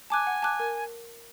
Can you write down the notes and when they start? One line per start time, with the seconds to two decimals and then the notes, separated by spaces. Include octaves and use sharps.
0.10 G#5 A5 D6 F#6
0.27 F#5
0.42 A5 D6 F#6
0.59 A#4